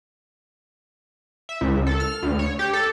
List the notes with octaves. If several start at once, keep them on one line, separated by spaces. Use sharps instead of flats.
E5
C#2
A4
F6
D2
C#5
G4
A4